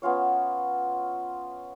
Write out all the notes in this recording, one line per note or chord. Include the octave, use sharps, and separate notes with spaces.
B3 C#4 F4 C#5